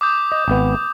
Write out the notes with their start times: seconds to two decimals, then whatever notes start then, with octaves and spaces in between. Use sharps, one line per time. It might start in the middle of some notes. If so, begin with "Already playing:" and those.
0.01 D6 D#6 G6
0.32 D#5
0.48 G#1 B3